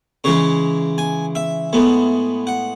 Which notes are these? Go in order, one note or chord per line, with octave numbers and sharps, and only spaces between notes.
C#3 E3 G#3 C#5
G#5
E5
A2 G#3 B3
F#5